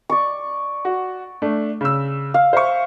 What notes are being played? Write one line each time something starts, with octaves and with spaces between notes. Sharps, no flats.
D5 C#6
F#4
A3 D4
C#3 E6
F5
C5 E5 C#6